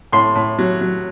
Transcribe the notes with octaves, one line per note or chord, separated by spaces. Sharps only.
A2 C6
A2
F#3
F#3